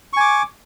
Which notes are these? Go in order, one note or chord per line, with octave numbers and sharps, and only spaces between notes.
G#5 C#6 D6